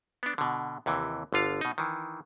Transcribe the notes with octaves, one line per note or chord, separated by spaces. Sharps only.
B3 D4
B2 D3
D#2 C3 E3
G1 D3 F4 F5
B2 D#4
D#3 E3